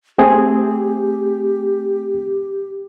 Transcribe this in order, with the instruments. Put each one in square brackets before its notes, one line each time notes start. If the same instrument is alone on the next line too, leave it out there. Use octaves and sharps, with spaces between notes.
[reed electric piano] A3 C4 G#4 [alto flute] G4